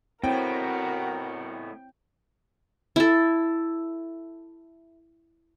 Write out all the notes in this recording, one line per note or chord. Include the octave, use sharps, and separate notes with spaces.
A2 B3 C4 E4 F#4 A#4 C#5 G5
E4 A4